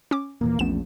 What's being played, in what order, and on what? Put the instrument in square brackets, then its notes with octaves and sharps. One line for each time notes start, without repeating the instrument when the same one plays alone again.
[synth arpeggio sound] C#4 D6
[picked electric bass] D#1 A#2 E3 [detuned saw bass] A#3
[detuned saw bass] A#1 [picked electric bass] E2 A3 C#4 [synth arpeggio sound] B3 E7